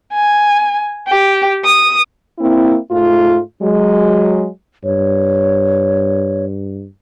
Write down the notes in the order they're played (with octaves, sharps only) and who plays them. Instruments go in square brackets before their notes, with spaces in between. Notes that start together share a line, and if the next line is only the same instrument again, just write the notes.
[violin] G#5
G4
D#6
[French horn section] A#3 C4 E4
G#2 A3 F4
F#3 G#3
[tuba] G2 [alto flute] C#5